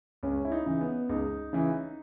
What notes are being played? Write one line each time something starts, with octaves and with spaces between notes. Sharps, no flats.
C#2 C#4
E4
D#4
C#3 E3
B3
C#2 D#4
C#3 E3